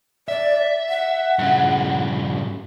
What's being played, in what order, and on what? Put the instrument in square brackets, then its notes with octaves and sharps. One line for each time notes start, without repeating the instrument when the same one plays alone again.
[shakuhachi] D5 [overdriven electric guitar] E5
[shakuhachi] F#5
[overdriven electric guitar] G2 C#3